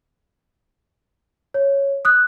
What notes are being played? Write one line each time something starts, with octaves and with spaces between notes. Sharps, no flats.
C#5
D#6 F#6